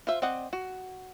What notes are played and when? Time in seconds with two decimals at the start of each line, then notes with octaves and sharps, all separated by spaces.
0.07 F4 C5 E5
0.22 C4 D5 D#5 F#5
0.53 F#4